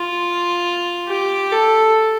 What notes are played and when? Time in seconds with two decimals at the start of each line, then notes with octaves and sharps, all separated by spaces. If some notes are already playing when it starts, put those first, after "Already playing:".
Already playing: F4
1.08 G4
1.52 A4